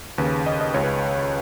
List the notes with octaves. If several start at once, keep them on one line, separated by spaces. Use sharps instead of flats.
D#2 C#3 B4
D#5
D#5
C#2 C#3 C#5
B4